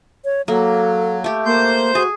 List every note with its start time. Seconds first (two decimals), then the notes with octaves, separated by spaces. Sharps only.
0.25 C#5
0.48 F#3 A#3 A4
1.24 A3 G4
1.45 A#3 C5 G6
1.95 F#4 G#4